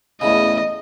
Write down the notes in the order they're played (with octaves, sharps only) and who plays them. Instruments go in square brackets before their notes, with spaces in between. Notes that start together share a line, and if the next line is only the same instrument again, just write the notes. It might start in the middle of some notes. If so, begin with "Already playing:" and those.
[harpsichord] E2 A2 C#3 [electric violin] D#5